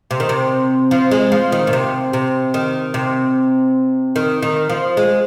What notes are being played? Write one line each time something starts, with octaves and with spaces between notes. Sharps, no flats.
C3
D#3
C3
F3
G#3
F3
D#3
A#2
C3
C3
D#3
C3
D#3
D#3
F3
G#3